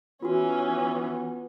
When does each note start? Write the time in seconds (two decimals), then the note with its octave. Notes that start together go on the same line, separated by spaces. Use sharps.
0.22 E3 B3 C#4 F4 F#4